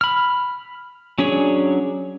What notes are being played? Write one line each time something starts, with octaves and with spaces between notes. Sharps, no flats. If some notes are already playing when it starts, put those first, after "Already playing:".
B5 F6
F#3 C#4 D4 G#4 C#5